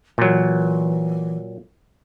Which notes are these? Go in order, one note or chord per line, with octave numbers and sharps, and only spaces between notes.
A#2 E3 F#3